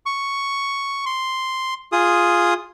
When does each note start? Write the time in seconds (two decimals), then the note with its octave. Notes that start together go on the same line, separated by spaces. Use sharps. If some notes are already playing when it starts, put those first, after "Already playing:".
0.06 C#6
1.06 C6
1.92 F4 G#4 D#6